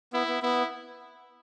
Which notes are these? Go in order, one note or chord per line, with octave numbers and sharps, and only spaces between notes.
B3 E4
B3
B3 E4